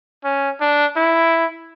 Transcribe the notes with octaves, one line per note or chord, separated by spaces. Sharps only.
C#4
D4
E4